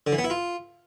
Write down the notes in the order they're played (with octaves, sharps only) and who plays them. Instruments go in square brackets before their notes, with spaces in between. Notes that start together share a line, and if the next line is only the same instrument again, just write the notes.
[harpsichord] D3
E3
B3
E4
F4